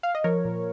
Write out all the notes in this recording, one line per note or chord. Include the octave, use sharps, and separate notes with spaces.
F5
D#5
F3 A#4 C#5
A#2